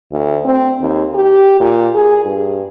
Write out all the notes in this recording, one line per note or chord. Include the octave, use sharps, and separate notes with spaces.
D2
C4
D#2
G4
A#2
G#4
G2